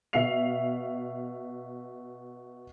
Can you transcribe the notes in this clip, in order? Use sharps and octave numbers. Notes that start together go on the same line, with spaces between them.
B2 E5 F5 C7 F7